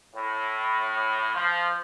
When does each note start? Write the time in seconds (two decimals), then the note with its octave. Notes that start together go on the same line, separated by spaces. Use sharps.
0.15 A2
1.35 F3